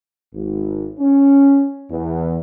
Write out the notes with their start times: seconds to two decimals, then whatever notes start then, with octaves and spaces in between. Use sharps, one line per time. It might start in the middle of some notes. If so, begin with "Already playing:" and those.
0.34 G#1
0.99 C#4
1.90 E2